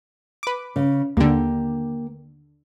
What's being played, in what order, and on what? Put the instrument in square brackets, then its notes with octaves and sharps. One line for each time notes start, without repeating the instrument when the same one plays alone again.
[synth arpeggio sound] B4 D6
[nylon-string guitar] C#3
[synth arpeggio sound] D#2 D3 [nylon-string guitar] A#3 G4